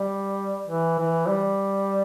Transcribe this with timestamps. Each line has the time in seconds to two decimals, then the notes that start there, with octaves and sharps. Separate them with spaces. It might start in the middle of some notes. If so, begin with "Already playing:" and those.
Already playing: G3
0.67 E3
0.99 E3
1.28 G3